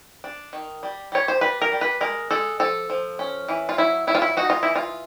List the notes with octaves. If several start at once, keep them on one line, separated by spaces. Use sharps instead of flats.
D4
D#3
G3
G3 C#5
C5
G3 B4
A#4
G3
B4
G#3 A#4
G#3 A4
F3 A4
F3
C#4
E3
F4
F#3 E4
F#3 E4
F4
E4
D#4 F#4
F4
E3 E4
F4